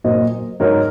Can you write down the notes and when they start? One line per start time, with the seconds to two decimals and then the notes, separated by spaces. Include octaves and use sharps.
0.04 A#2 F#3 C5 D#5
0.60 G#2 F#3 A#4 C#5